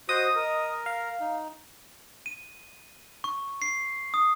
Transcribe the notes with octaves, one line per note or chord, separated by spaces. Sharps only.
F#4 C5 D#5 D#6
A#4
F5
D#4
D#7
C#6
C7
D#6